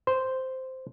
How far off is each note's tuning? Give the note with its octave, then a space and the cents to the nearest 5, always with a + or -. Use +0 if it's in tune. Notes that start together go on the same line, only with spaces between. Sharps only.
C5 -5